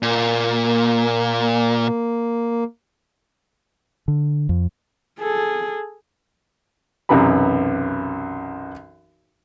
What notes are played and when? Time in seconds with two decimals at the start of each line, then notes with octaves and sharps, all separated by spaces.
0.03 A#2 A#3
4.08 D3
4.49 F2
5.19 G#4 A4
7.09 B1 F#2 C3 E3 A#5 B5